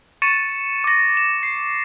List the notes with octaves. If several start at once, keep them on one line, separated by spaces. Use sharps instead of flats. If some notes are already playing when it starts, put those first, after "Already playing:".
C#6 A6 C#7 D#7 E7
D6 A#6
E7
C7